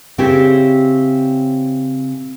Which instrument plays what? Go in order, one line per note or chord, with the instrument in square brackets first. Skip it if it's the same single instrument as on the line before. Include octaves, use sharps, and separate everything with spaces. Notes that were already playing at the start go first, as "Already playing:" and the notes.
[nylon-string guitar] C#3 C4 E4 G4 C5 C#5